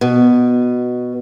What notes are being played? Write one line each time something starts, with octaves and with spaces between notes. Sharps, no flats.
B2